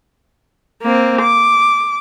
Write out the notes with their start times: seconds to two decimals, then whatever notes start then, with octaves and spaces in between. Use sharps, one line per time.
0.82 A#3 C4
1.21 D6